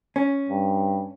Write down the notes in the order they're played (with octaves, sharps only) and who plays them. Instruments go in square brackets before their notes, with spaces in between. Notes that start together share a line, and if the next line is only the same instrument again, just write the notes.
[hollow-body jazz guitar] C#4
[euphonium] G2